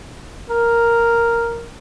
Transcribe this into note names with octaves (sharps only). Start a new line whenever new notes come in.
A#4